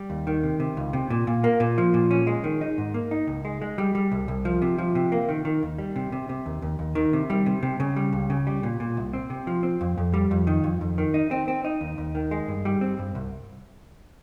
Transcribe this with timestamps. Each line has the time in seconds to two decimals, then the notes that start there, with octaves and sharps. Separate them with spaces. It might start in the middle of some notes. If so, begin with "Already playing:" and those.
Already playing: G3
0.10 D#2
0.27 D#3
0.43 C3
0.60 C3
0.77 C#2
0.93 C3
1.10 A#2
1.27 A#2
1.44 A#3
1.60 A#2
1.78 F3
1.94 A#2
2.11 C#4
2.27 G#3
2.44 D#3
2.61 D#4
2.78 G#2
2.94 A#3
3.11 D#4
3.27 C#2
3.45 G#3
3.62 G#3
3.78 G3
3.95 G3
4.11 C2
4.28 C2
4.45 F3
4.62 C3
4.78 F3
4.95 C3
5.12 A#3
5.29 D#3
5.45 D#3
5.63 D#2
5.78 G3
5.96 C3
6.12 C3
6.29 C3
6.46 D#2
6.62 D#2
6.79 D#2
6.95 D#3
7.13 C3
7.30 G3
7.46 C3
7.63 C3
7.80 C#3
7.96 G3
8.13 C#2
8.30 C#3
8.47 G3
8.63 A#2
8.80 A#2
8.97 C2
9.13 C4
9.30 C3
9.47 F3
9.63 C4
9.81 F2
9.98 F2
10.14 G3
10.31 F2
10.47 D#3
10.64 F2
10.81 F2
10.98 D#3
11.14 D#4
11.31 C4
11.48 C4
11.64 D#4
11.81 D#2
11.98 D#2
12.15 D#3
12.31 G#3
12.48 G2
12.65 G3
12.81 C4
12.99 G2
13.15 C2